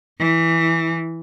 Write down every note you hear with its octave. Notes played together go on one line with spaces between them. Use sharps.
E3